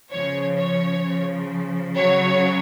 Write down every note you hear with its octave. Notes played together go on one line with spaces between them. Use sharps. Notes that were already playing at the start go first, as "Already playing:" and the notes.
C#3 F3 C#5
C#5
C#3 F3
C#3 F#3 C#5